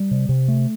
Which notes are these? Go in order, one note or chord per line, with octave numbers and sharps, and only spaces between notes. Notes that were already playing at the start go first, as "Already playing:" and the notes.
Already playing: G3
C3
C3
A3